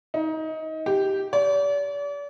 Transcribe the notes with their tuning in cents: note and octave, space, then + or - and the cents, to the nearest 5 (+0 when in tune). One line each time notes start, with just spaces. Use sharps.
D#4 +25
G4 -5
D5 -40